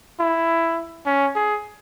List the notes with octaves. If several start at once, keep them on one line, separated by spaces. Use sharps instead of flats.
E4
C#4
G#4